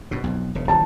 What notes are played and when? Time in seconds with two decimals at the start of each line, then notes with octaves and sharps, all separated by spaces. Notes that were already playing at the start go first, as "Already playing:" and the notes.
0.11 F#2 B2
0.24 B1 F2
0.55 E1 C#3
0.68 F#1 D#3 E3 A5